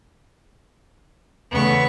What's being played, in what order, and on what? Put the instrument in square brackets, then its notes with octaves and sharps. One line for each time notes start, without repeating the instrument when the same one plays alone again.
[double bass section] E2 C#3 A3 [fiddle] B3 C#6